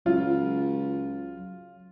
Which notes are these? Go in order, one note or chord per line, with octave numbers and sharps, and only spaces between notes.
C#2 F#3 F4